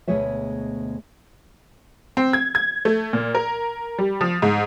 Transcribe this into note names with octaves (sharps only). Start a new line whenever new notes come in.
D2 B2 G#3 G#4 C#5 E5
C4
G#6
G#6
A3
A#2
A#4
G3
F3
G#2